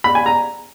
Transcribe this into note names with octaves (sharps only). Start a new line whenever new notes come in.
B5
G#5
A#5